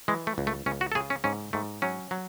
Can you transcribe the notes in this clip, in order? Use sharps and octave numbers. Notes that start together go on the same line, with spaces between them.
E3 G#3
A3
C#2
A3
C#2 C#4
F#4
A4
C#3 G#4
C#4
G#2 C#4
G#2 A3
F#3 C#4
F#3